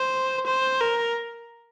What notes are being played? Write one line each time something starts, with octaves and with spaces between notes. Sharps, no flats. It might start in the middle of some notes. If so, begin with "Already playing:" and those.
Already playing: C5
C5
A#4